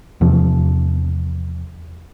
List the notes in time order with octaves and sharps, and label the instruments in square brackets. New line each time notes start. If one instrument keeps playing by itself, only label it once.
[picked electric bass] E2 C3 F3